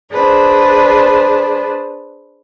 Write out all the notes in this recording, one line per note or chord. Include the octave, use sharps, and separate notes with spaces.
D4 G#4 B4 C5